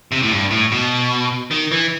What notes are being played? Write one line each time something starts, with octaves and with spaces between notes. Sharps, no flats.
C3
A2
G2
A2
B2
D#3
E3